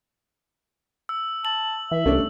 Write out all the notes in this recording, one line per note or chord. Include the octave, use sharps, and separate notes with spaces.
E6
A5 F#7
E3 E5
C2 A3 C#4 D4